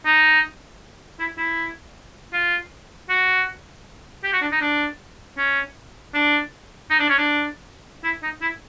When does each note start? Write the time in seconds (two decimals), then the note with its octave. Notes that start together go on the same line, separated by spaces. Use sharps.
0.05 D#4
1.19 E4
1.37 E4
2.33 F4
3.09 F#4
4.23 G4
4.32 F#4
4.41 D4
4.52 D#4
4.61 D4
5.37 C#4
6.14 D4
6.90 D#4
6.99 D4
7.09 C#4
7.18 D4
8.04 E4
8.23 D#4
8.41 E4